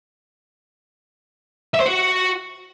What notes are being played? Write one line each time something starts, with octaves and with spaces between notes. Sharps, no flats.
E5
C5
F#4